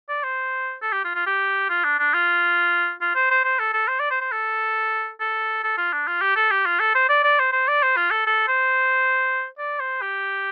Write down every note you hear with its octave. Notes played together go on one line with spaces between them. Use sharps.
D5
C5
A4
G4
F4
F4
G4
F4
D4
D4
F4
F4
C5
C5
C5
A4
A4
C5
D5
C5
C5
A4
A4
A4
F4
D4
F4
G4
A4
G4
F4
A4
C5
D5
D5
C5
C5
D5
C5
F4
A4
A4
C5
D5
C5
G4